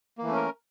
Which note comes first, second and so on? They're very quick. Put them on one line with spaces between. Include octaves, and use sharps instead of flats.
A#3 E3 A3 C#4 A#4